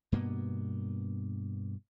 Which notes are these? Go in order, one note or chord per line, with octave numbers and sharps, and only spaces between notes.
G2 B2 A#3 B3